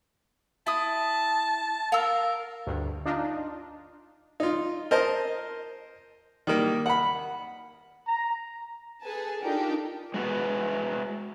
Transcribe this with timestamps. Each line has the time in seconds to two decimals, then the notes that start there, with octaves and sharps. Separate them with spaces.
0.67 E4 A5 D#6
1.92 A#4 F5 E6
2.67 D2 G2
3.06 D4 D#4 F4
4.40 D#4 F4
4.91 A#4 C5 D#5 A5
6.47 D#3 G3 A#3
6.86 F#5 B5
8.07 A#5
9.03 G#4 A4 B4 G#5 A5
9.42 D4 D#4 F4 G4 A4 A#4
10.14 G#3 F#4 B4